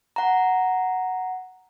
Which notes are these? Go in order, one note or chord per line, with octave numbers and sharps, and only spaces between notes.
F#5 A#5